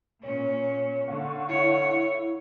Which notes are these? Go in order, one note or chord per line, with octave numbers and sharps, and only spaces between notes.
A#2 C#4 C#5
D3 F5 F#5 C#6
E4 C#5